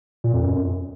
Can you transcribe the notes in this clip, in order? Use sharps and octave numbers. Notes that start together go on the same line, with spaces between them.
A#2
F2
F#2